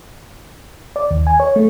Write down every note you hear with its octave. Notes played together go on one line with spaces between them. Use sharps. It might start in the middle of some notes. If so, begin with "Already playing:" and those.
D5
D#2
G#5
C#5
A3